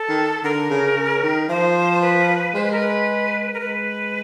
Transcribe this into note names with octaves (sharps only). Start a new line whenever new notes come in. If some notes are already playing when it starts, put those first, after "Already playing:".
Already playing: A4
D#3
D3 A#4
C#3
C#3
D#3
F3 C5
C5
B4
G#3 C5
B4
A#4
B4
A#4
G#3 B4